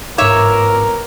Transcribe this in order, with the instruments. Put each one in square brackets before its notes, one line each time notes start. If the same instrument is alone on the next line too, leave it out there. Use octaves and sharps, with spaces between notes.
[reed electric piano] G#2 D6 [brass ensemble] B3 F4 A#4 [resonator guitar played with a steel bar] C#5 E5